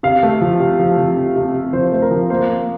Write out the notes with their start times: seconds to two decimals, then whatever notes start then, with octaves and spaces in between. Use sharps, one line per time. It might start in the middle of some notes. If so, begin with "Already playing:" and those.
0.03 C3 F5
0.23 A3
0.41 F3
0.60 C3
0.79 F3
0.98 F3
1.17 C3
1.36 C3
1.54 C3
1.73 F3 C5
1.92 A3 C5
2.02 A#4
2.11 F3
2.30 A#3 C5
2.49 A#3